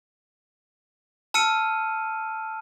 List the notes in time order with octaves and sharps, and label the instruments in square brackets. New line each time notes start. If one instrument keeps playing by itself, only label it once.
[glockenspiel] A5 E6 F6 C#7 D#7